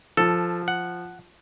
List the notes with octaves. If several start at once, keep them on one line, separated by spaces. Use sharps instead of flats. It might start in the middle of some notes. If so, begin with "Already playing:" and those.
F3 A4
F#5